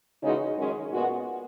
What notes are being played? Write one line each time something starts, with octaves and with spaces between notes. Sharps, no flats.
C#3 E3 G#3 D#4 F#4
F#2 D#3 G#3 C#4
A#2 G#3 B3 F#4